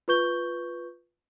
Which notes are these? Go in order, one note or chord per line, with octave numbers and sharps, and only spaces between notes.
F4 B4 C#6 G6 G7